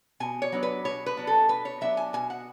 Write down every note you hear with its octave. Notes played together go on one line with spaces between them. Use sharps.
B2 G#5
C#5
F#3 B3 D4
B4
B2 C#5
B4
F#3 B3 D4
A4
B2 B4
C#5
F#3 B3 D4 E5
G#5
B2 G#5
F#5